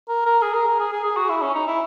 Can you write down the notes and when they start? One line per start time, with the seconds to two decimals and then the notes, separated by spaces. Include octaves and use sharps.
0.08 A#4
0.25 A#4
0.42 G#4
0.54 A#4
0.67 A#4
0.80 G#4
0.92 G#4
1.04 G#4
1.17 F#4
1.29 E4
1.42 C#4
1.54 D#4
1.67 E4